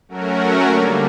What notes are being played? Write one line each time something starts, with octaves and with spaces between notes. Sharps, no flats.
F#3 A3 C#4 F#4 A#4
D3 G3 A#3